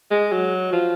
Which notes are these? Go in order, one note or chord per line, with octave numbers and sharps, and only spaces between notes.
G#3
F#3
F3